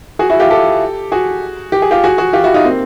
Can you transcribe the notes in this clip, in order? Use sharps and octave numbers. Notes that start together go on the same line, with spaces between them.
F#4 G#4
E4 F#4
F4 G4
G4 A4
F#4 G#4
G4
G#4
F4 G4
F#4 G#4
F#4 G#4
F4 G4
E4 F#4
D#4 F4
A#3 C4